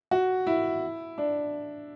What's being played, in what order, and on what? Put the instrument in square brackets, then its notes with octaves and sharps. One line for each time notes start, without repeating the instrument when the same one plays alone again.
[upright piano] F#4
E4
D4